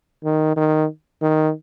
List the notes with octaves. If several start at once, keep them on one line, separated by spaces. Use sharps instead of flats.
D#3
D#3
D#3